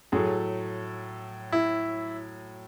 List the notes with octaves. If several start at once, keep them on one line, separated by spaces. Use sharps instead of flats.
A2 F#3 A3 G#4
E4